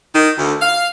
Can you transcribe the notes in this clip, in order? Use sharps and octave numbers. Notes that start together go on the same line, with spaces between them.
D#3
D2
F5